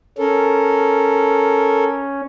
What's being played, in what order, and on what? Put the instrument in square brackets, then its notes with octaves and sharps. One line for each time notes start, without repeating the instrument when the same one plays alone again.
[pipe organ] C#4 [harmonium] A4 A#4